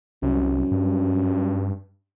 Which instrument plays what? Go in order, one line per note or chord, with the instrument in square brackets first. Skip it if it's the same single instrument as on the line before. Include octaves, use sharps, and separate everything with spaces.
[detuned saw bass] C2 [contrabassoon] F#2
[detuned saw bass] G2